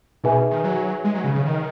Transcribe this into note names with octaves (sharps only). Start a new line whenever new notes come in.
B2 D#4 G#4 B4 E5 G#5
D#3
F#3
G#3
F#3
C#3
C#3
D#3